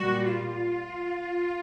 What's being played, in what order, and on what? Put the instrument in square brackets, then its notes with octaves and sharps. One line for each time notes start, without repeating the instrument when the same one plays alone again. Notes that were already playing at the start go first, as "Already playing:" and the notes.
Already playing: [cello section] A#2 G3 F#4
F4